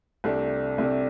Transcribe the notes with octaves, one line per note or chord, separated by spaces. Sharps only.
C2 C3 A3 D4
C2 C3 A3 D4